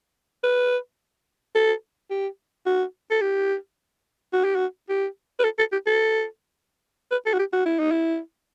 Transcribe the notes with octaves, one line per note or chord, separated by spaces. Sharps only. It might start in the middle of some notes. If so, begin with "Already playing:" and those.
B4
A4
G4
F#4
A4
G4
F#4
G4
F#4
G4
B4
A4
A4
G4
A4
B4
A4
F#4
G4
F#4
E4
D#4
E4